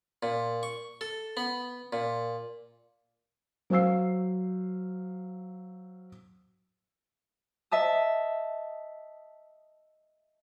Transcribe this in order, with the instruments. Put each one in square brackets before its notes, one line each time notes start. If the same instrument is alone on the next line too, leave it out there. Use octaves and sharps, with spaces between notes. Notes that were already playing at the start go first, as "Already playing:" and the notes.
[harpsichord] A#2
C#6
A4
B3
A#2
[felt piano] F#3 C5 F5 E6 C7
[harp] D#5 E5 A5 D#6